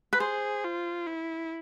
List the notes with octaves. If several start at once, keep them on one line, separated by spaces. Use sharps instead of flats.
B4
G#4 C5
F4
E4